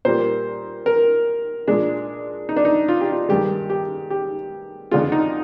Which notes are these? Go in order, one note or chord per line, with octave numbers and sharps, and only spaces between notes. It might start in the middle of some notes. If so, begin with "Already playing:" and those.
A#2 G3 A#3 C5
A#4
A#2 G#3 D4
D#4
D4
D#4
F4
G4
F4
G2 D#3 G#3 G4
G4
G4
F2 D3 G#3 F4
D#4